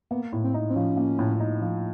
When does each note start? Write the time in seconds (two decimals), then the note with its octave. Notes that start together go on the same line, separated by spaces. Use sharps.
0.11 A#3 B3
0.33 A2
0.44 C4
0.54 D#4
0.69 C4
0.75 F3 C#4
0.97 A#3
1.19 A2
1.40 D#4
1.62 F3